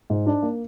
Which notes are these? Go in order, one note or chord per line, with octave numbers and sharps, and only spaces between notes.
G#2
D4
A#3